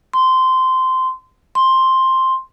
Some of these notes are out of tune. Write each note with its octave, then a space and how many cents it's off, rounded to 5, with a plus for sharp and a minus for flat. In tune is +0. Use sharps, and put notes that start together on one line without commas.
C6 -15
C6 +5